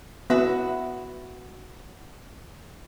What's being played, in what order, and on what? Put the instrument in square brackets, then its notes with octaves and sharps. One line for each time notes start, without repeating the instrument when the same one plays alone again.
[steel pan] B3 [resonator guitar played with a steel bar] F#4 B4 E5